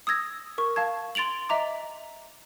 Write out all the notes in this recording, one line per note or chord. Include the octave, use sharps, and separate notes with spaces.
D#6 E6 G#6 A#6
A#4 C#6
F5 A5 G#6
C6 A6 D7 F7 F#7
D#5 E5 A#5 D6